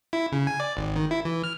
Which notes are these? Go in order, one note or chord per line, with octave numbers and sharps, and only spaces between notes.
E4
C#3
G#5
D5
G#1
D#3
E4
E3
F6